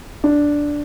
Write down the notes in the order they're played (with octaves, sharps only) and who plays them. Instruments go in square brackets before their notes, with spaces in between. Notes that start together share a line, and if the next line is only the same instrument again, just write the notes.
[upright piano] D4